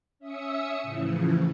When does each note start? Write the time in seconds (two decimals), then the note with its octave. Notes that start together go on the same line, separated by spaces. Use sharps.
0.19 C#4 E5 D#6 E6 C#7
0.82 A2 C#3 E3 F3